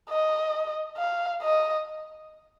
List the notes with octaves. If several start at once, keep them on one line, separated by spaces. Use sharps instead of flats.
D#5
F5
D#5